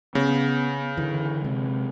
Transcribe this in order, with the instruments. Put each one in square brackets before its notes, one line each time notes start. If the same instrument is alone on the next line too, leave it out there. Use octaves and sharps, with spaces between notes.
[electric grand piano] C#3 [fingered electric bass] B3
[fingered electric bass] D3 E3
C3 G#3